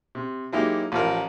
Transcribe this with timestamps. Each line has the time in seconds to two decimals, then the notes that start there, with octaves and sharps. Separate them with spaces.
0.15 C3
0.53 F#3 G#3 A#3 D#4 E4 G4
0.92 A1 F3 A#4